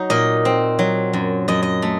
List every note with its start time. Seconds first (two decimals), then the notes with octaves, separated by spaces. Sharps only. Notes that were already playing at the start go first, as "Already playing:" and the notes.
Already playing: F#3 D#4
0.10 A#2 D#5
0.45 C4
0.79 F#3
1.13 F#2
1.48 F#2 D#5
1.63 D#5
1.82 A3